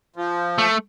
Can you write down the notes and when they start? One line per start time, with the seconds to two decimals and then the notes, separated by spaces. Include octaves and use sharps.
0.16 F3
0.58 A3